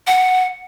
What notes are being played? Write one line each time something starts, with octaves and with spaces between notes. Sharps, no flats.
F#5